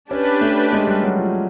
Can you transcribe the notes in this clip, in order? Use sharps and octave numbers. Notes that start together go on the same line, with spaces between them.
C#4 D4 G4 B4
A3
G#3
G3
F#3
F3